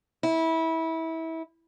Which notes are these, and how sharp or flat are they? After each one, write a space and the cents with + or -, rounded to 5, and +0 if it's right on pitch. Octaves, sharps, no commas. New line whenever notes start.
E4 -25